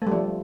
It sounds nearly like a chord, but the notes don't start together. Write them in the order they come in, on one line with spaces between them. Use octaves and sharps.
A3 G3 F3